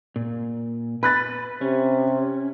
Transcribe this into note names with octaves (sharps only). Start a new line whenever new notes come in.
A#2
B4 B5 F#6 A6
C3 C#4